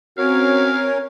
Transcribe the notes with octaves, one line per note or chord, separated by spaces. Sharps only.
C4 C#4 F#4 A#4 C#5 F5